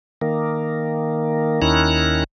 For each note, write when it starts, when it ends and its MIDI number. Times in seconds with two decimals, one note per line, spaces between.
0.21 1.61 51
0.21 1.61 58
1.62 2.24 39
1.62 2.24 51
1.62 2.24 61
1.62 2.24 64
1.62 2.24 82
1.62 2.24 90